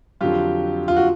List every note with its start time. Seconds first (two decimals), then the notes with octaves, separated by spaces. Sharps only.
0.21 F2 D3 F#3 F4 G4
0.88 F4
0.96 F#4